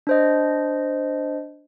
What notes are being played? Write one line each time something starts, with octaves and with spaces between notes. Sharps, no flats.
D4 C5 D#5